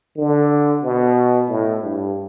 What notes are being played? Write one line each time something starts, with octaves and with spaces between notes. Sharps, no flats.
D3
B2
A2
G2